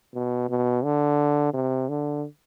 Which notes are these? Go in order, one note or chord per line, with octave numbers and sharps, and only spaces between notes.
B2
B2
D3
C3
D3